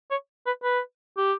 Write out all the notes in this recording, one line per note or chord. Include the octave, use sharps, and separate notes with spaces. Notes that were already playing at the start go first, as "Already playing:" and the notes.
C#5
B4
B4
G4